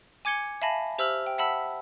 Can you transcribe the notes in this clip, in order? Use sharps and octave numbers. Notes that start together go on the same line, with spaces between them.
G#5 D6 G#6 C#7 G7
E5 F5 G#5 A5 B5 A#6
G4 C5 E5 E6 F6 F#7
G5
E5 F#5 A5 B5 E6 B6